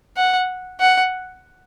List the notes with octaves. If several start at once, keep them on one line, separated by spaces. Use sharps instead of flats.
F#5
F#5